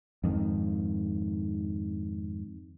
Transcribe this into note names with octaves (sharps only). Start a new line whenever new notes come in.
F2 G#2 D#3